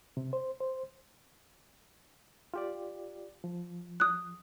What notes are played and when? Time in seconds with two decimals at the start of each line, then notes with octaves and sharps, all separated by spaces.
0.17 C3
0.33 C5
0.60 C5
2.54 F4 G4 D5
3.44 F3
4.00 D#6 F#6